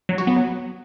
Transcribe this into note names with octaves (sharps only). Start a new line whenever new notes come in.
F#3
F#4
B3
F#3